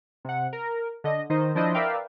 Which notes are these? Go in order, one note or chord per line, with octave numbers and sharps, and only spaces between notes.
C3 F#5
A#4
D3 D#5
D#3 D#4 C5 D#5
F3 D4 E4 C5 D#5
A#4 B4 D5 E5 F5 G5